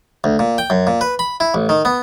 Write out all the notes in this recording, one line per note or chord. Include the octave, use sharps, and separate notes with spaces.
D2
A#2
G5
F#2
A#2
B4
B5
E4
A1
D#3
B3